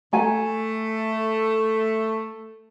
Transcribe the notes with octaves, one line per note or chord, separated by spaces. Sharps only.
A3 G#5 A#5